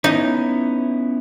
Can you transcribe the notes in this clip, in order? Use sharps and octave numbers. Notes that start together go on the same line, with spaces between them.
B3 C#4 D#4 E4